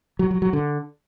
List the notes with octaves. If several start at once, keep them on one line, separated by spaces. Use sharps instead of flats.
F#3
F#3
F#3
D3